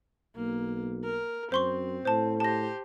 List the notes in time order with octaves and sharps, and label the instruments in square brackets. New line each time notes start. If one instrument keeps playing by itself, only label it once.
[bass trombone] B1 [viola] A#3
[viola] A#4
[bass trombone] F#2 [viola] C4 [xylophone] C5 C6 C#6
[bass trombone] A2 [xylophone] C5 A5
[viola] G4 C5 [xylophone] A5 A#6